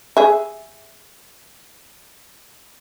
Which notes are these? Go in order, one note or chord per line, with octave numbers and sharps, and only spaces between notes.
G#4 E5